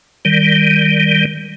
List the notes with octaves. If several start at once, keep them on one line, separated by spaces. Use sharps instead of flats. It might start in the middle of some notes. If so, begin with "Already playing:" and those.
D#3 G3